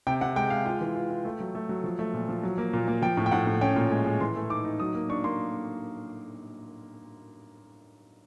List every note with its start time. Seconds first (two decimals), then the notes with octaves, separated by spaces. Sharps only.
0.07 C3 G5
0.21 C3 F#5
0.36 G#3 G5
0.50 G#3 F5
0.66 F4 G5
0.81 E3
0.95 F4
1.10 F4
1.25 A3
1.40 F#3
1.55 A3
1.69 F#3
1.84 F3
1.99 A3
2.14 A#2
2.29 F3
2.43 F#3
2.58 A#3
2.73 A#2
2.88 A#3
3.02 F3 G5
3.17 A2
3.26 G5
3.32 A2 F#5
3.47 A2
3.61 C#4 G5
3.76 A#2
3.91 G#3
4.06 G#3
4.20 E3 C6
4.36 A3
4.50 D#4 D6
4.64 D#4
4.80 F#3 D#6
4.95 A#3
5.09 D4 C#6
5.24 A#3 C6